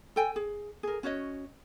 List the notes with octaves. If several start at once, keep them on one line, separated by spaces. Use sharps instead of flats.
A4 G5 G#5
G#4
G#4 A#4
C#4 F#4 C#5 D#5